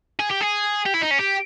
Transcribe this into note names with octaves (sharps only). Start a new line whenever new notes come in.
G#4
G4
G#4
G4
E4
D#4
C#4
G4